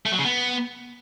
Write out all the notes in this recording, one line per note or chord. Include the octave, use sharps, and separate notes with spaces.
A3
F#3
C#3
B3